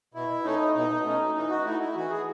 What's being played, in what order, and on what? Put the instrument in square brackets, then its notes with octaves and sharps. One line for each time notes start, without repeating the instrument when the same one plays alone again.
[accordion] B2 E4
A3 C#4 D#4
B2 D#4
A3 C#4
E3 D#4
F#4
A3 D#4 E4
E4
E3 F#4
G#4